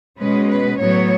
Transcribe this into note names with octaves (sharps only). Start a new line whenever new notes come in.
B2 G#3 C#4 B4
B4
A2 F#3 B3 C#5